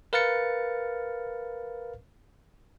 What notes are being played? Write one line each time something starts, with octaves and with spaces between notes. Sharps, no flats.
A#4 B4 F5 F6 A6 C#7